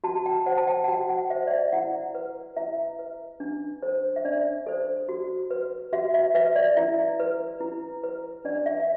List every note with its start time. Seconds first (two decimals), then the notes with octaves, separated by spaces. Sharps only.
0.04 F#4 A5
0.26 G5
0.46 C5 F#5
0.57 A5
0.67 G5
0.84 F#5
0.88 F#4 G5
1.09 F#5
1.30 C5 E5
1.47 D5
1.51 E5
1.73 E4 F#5
2.15 B4
2.57 E4 E5
2.99 B4
3.40 D4
3.82 A4 C5
4.16 E5
4.25 D4 D5
4.67 A4 C5
5.09 F#4
5.51 B4
5.93 F#4 E5
6.14 E5
6.35 B4 E5
6.56 D5
6.76 E4 E5
7.20 B4
7.61 E4
8.04 B4
8.45 D4 D5
8.66 E5
8.80 E5